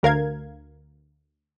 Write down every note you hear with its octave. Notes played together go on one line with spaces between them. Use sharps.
D2 A#4 F5 G#6